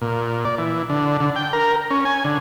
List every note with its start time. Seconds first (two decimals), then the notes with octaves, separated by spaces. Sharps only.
0.01 A#2
0.45 D5
0.58 E3
0.90 D3
1.20 D3
1.36 G5
1.53 A#4
1.90 C#4
2.05 G#5
2.25 D3